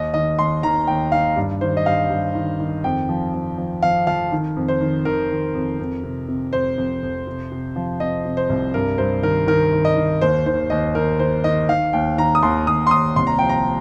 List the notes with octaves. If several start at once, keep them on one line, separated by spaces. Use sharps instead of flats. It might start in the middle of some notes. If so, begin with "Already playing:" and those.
Already playing: D#2 D#5
D#3 D#5
D#2 C6
D#3 A#5
D#2 G5
D#3 F5
G2
D#3 C5
D#5
G2 F5
G2
D#3
D#3
F2 G5
F3
F3
F3
F3 F5
F3 F5
D#3
F2
C5
D#3
D#3 A#4
D#3
F2
F2
C3
C3
F2 C5
F2
F2
C3
C3
F3
C3 D#5
C3
C5
C2
G2 A#4
G2 C5
D#3 A#4
D#3 A#4
D#3
D#5
D#3
D#2 C5
D#3 C5
D#2 D#5
D#3 A#4
D#3 C5
D#3 D#5
D#3 F5
D#2 G5
D#3 A#5
D#6
D#2 C6
D#2 D#6
C6
D#2 D#6
C2 C6
A#5
F3 G5
A#5